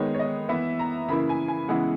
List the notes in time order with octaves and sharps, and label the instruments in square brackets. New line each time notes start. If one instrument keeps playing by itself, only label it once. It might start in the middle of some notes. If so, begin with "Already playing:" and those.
Already playing: [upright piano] D#3 G#3 B3 D#4 C#5
C#5
D#5
E3 B3 E4 E5
A#5
C#3 E3 A#3 E4 B5
G#5
G#5
C#3 E3 G#3 B3 E4 F#5